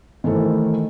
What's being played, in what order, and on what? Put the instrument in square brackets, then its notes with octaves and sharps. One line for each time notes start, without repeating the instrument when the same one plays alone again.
[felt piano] D#3 E3 A3 A4 C5